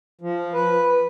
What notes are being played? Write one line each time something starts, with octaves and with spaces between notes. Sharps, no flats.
F3
B4